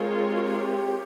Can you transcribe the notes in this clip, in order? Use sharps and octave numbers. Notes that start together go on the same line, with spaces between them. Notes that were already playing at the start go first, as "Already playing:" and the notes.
Already playing: G#3 C4 F4 G#4 A#4 C#5
G4
F#4
G4